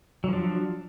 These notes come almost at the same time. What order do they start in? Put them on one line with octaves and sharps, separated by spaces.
F#3 F3 D4